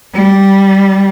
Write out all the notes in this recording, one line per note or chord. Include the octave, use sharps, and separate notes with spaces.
G3